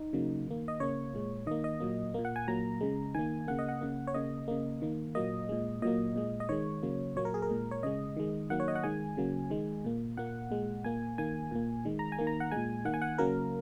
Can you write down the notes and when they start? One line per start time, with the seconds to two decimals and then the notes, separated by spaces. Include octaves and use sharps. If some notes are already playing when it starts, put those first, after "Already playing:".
Already playing: D#4
0.13 C#3 F#3 A#3
0.47 D#3 A#3
0.68 D#5
0.80 C#3 A#3 C#5
1.14 A#2 G#3
1.46 D#3 A#3 D#5
1.64 D#5
1.80 A#2 F#3 A#3
2.14 A#2 A#3
2.25 F#5
2.36 G#5
2.48 A#2 F#3 A#3 A#5
2.81 C#3 G#3
3.14 D#3 A#3 G#5
3.48 C#3 A#3 F#5
3.59 D#5
3.69 F#5
3.81 C#3 A#3
4.07 C#5
4.14 C#3 A#3 D#5
4.48 C#3 A#3
4.82 D#3 A#3
5.15 A#2 F#3 A#3 D#5
5.49 A#2 G#3
5.82 A#2 F#3 A#3 D#5
6.16 A#2 G#3
6.40 D#5
6.49 D#3 G#3 C#5
6.83 C#3 F#3 A#3
7.16 A#2 F#3 A#3 C#5
7.25 A#4
7.34 G#4
7.42 A#4
7.50 A#2 G#3
7.71 C#5
7.83 C#3 G#3 D#5
8.17 D#3 G#3
8.50 D#3 F#3 A#3 F#5
8.60 C#5
8.68 D#5
8.75 F#5
8.83 D#3 G#3 G#5
9.17 C#3 F#3 A#3
9.50 D#3 G#3
9.84 A#2 A#3
10.17 A#2 A#3 F#5
10.51 A#2 G#3
10.84 A#2 A#3 G#5
11.18 D#3 A#3 G#5
11.51 A#2 A#3
11.85 D#3 G#3
11.99 A#5
12.12 G#5
12.19 D#3 A#3
12.27 A#5
12.40 F#5
12.52 A#2 G#3 G#5
12.85 D#3 A#3 F#5
12.94 G#5
13.02 F#5
13.18 C#3 F#3 A#3 A#4